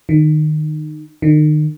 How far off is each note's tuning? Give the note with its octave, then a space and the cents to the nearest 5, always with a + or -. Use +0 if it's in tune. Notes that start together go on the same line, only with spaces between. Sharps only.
D#3 -25
D#3 -35